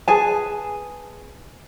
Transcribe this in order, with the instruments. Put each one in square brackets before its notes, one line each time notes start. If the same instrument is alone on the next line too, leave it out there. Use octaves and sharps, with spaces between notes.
[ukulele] G#4 B4 G#5 A5